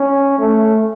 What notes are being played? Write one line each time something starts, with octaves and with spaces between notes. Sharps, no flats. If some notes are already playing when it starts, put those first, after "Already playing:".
Already playing: C#4
A3